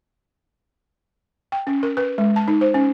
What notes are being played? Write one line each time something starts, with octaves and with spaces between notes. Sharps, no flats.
G5
C#4
A#4
B4
G#3
A5
D#4
C5
C#4